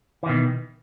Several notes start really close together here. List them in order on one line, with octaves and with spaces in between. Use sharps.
E3 D#3 B2